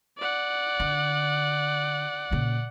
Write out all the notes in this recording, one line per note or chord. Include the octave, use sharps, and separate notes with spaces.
D5 F#5
D3
A#2 C#3